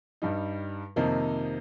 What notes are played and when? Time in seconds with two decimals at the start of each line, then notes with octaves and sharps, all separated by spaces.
0.22 G2 G3 D#4
0.96 F2 C3 D#3 A#3 D#4